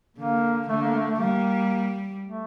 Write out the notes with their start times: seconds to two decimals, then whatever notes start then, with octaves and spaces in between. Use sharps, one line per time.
0.17 D3 A#3
0.69 D3 A3
0.82 A#3
0.95 A3
1.08 A3
1.20 G3 A#3
2.23 A3